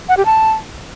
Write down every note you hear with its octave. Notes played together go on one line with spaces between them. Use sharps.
F#5
G4
A5